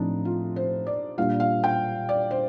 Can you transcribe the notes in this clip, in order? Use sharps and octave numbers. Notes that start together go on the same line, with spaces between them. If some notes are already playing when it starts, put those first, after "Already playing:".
Already playing: A2 F3 C4 D4 D#4
F4
C5
D5
A#2 G3 D4 F4 F5
F5
G5
D5
C5